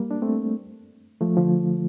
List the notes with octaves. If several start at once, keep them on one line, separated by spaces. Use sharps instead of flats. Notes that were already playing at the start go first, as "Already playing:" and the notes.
Already playing: G3 A#3
D4
A3 C4
F3 A3
D3 F3